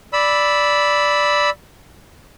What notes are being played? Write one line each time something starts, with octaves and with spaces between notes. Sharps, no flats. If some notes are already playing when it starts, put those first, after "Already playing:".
D5 B5 E6